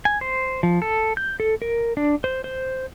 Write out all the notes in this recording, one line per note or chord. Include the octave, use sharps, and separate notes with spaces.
G#5
C5
F3
A4
G6
A4
A#4
D4
C5
C5